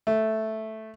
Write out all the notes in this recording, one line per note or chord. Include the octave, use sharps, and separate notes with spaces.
A3